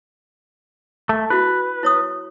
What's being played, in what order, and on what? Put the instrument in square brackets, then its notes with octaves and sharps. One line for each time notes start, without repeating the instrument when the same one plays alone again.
[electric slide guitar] A3
[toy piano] E4 F#4 [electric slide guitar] B4
[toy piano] E4 C#5 D#6